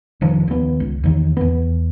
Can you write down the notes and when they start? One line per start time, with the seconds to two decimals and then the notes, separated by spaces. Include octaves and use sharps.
0.21 F1 D#3 F3
0.48 D#2 B3
0.80 C#2
1.04 E2 D#3
1.37 E2 B3